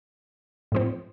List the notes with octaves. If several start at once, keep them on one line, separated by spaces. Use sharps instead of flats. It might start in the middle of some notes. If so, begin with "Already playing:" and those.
A2 F3 C4